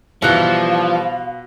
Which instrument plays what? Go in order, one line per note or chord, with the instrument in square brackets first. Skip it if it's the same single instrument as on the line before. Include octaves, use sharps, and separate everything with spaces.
[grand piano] B2 F#6 C#7 [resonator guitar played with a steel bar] E3 G3 [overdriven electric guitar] F3 [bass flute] F5